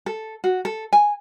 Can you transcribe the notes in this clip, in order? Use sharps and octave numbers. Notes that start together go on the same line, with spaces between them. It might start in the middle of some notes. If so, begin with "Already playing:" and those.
A4
F#4
A4
G#5